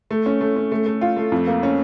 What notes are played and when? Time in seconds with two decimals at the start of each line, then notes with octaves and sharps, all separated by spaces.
0.11 A3
0.26 C#4
0.41 A3
0.56 C#4
0.72 A3
0.86 A3
1.01 F4
1.17 A3
1.32 F2
1.47 A#3
1.63 C#4